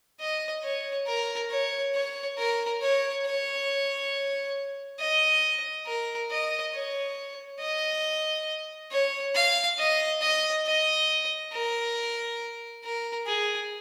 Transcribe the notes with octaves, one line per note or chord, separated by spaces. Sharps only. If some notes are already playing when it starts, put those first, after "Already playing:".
D#5
C#5
A#4
C#5
C#5
A#4
C#5
C#5
D#5
A#4
D#5
C#5
D#5
C#5
F5
D#5
D#5
D#5
A#4
A#4
G#4